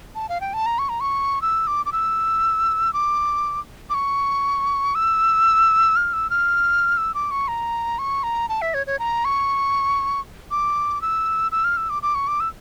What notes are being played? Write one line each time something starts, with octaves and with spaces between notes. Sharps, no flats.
A5
F5
G5
A5
A#5
C#6
A#5
C#6
E6
D6
D6
E6
D6
D6
C#6
E6
F6
E6
F6
E6
D6
C#6
A#5
C#6
A#5
A5
E5
C#5
C#5
A#5
C#6
D6
E6
E6
F6
E6
D6
D6
C#6
D6
E6